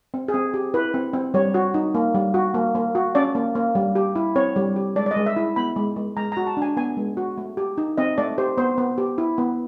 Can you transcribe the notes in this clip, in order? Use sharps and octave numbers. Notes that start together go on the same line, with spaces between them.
C4
G#4
C4
G4
E4 B4
C4
C4
G3 C#5
F#4
D#4
A#3
G3
F#4
A#3
A#3
F#4
C#4 D5
A#3
A#3
G3
G4
E4
C4 C#5
G3
G4
G#3 D5
D5
D#5
G#3
E5
E4
B3 B5
G#3
G#3
G#3 A#5
F#4 A#5
A5
D4 G#5
B3 G#5
G#3
F#4
A3
G4
D#4
C4 D#5
A3 D5
G4 C5
B3 C5
B3
G4
E4
B3